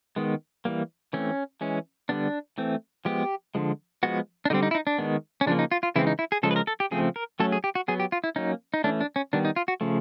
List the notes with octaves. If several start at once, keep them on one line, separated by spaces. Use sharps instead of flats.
D#3 G#3 B3
E3 G3 A#3
E3 A3 C4 C#4
E3 G#3 C#4
D3 G3 B3 D4
E3 A3 C4
F3 G#3 B3 G4
D3 F3 G#3
F3 G#3 B3 F#4
D4
D3 G3 C4 D#4
D#4
E4
D#4
D4
D#3 G#3 B3
C#4
C#3 F3 A#3 D4
D#4
F4
F4
C#3 E3 G#3 C4 E4
D#4
E4
G#4
C#3 F3 G#3 A4
B4
A#4
A4
G4
C#3 F3 A3 C4 G#4
A#4
F#3 A3 C#4 A4
G#4
G4
F#4
F#3 B3 G#4
G4
F4
E4
F#3 A#3 C#4 D#4
D#4
E3 A3 C#4 D4
D4
C#4
D#3 G3 B3 D4
D#4
F4
F#4
C#3 F3 A3